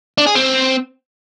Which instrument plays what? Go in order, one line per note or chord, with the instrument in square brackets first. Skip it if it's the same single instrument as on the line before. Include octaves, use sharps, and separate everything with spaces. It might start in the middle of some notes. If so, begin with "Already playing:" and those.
[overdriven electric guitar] D4
G#4
C4